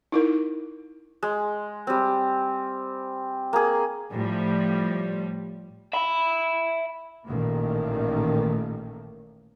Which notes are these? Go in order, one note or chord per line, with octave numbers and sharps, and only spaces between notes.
D#4 E4 A#4
G#3
G3 C4
A#3 G#4
A2 F3 G3
E5 B5
A1 A#2 D#3 A3 A#3